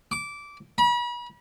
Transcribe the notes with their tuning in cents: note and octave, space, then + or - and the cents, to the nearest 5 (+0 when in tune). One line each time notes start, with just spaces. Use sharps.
D6 -15
B5 -40